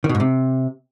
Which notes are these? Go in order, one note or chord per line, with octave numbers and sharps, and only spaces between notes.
D#3
B2
G#2
C3